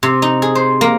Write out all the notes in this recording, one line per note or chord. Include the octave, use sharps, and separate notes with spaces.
C3
D#4
G#4
C5
A#3